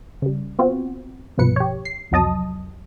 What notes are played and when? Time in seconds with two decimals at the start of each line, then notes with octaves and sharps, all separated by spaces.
0.22 C#3 G3
0.59 B3 C4 F4 F#4
1.38 C2 G2 B2 F3 B4 C#7
1.56 G4 C#5
1.85 C7
2.11 C2 F2 F#3 D#5 A5 D#6